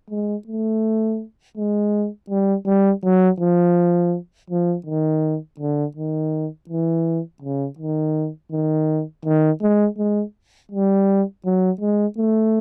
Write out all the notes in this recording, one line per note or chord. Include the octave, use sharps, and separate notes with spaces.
G#3
A3
G#3
G3
G3
F#3
F3
F3
D#3
D3
D#3
E3
C#3
D#3
D#3
D#3
G#3
G#3
G3
F#3
G#3
A3